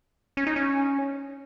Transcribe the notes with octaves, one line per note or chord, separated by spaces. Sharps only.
C#4
D#4
C#4